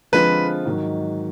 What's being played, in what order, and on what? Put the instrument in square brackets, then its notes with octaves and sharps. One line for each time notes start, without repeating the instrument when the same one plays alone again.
[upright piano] D3 F3 G#3 C4 F4 [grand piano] B4
[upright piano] G#2 D#3 F#3